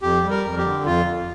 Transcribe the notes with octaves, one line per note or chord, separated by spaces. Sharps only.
F2 G4
G3
A#4
F2
G4
D3
F2 F4
F2